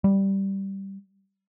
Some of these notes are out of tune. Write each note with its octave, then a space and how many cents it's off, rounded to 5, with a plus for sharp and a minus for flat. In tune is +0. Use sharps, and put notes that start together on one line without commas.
G3 -5